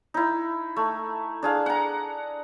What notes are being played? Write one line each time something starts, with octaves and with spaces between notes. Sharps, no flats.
D#4 E4
A3
D4 G#4 F5
F#5 A#5